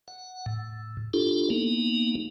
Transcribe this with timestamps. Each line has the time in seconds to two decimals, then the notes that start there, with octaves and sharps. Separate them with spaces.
0.08 F#5
0.46 A2
1.14 D4 E4 F4 G4 A4
1.50 A#3 B3 D#4